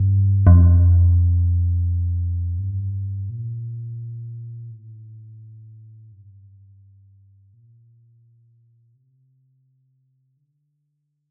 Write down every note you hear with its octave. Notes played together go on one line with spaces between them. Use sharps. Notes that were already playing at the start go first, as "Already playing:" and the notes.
Already playing: G2
F2
G2
A#2
A2
G2
A#2
C3
D3